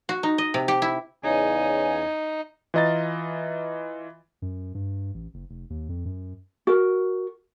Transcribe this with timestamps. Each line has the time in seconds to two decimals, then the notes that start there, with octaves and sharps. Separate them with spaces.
0.09 F#4
0.23 D#4
0.38 D#5
0.54 C3
0.68 G4
0.82 E4
1.24 E2 C#3 D#4 G#5
2.74 E3 F4 D#5 A#5 A6
4.42 F#2
4.75 G2
5.14 A1
5.34 F#1
5.50 F1
5.70 D#2
5.89 F2
6.05 F#2
6.67 F#4 A#4